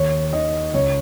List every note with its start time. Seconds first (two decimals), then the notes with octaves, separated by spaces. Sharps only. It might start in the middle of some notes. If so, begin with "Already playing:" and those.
Already playing: D#2 C#5
0.33 D#3 D#5
0.74 C#2 C#5